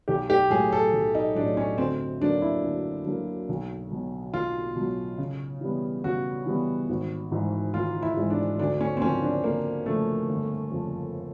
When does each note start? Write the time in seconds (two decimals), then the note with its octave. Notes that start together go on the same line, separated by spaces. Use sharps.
0.08 B1 G4
0.30 G4
0.50 A2 F#3 G#4
0.72 A4
0.93 B1
1.15 D#4
1.35 A2 F#3 D4
1.57 C#4
1.78 D2 C4
2.21 D3 F#3 A#3 D4
2.42 E4
2.63 D2
3.06 D3 F#3 A#3
3.49 B1
3.91 B2 F#3
4.34 B1 F4
4.76 B2 F#3
5.18 C#3
5.61 E3 G3 B3
6.04 C#3 F#4
6.46 E3 G3 B3
6.89 G#1
7.32 G#2 E3 G#3
7.74 G#1 F4
8.03 E4
8.17 G#2 E3 G#3
8.30 D4
8.59 D2 D4
8.81 C#4
8.97 C4
9.02 C#3 F3 A#3 C#4
9.22 D4
9.44 D2 A#3
9.86 C#3 F3 A3 A#3
10.29 G1
10.71 F2 C#3 F3 A#3